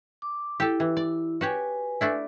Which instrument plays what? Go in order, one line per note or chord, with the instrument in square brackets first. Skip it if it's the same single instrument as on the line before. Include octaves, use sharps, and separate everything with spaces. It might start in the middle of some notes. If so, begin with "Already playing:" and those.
[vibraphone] D6
[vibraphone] E4 [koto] G4 A4
[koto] E3
D5
[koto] F#4 G4 C#5 [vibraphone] B4 G#5
[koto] A3 D4 E4